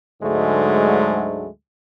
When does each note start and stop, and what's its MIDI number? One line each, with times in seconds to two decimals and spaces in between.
0.22 1.47 38
0.22 1.47 44
0.22 1.47 50
0.22 1.47 54
0.22 1.47 56
0.22 1.47 57